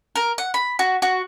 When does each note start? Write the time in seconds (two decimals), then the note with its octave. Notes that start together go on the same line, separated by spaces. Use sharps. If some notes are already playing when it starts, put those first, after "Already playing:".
0.16 A#4
0.38 F#5
0.54 B5
0.79 F#4
1.02 F#4